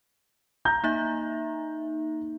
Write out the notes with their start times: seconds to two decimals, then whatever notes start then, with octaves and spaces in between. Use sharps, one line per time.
0.65 A#5 G6
0.84 A#3 D#4 E5